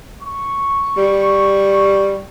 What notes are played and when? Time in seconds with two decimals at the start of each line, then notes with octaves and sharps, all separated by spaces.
0.21 C#6
0.97 G3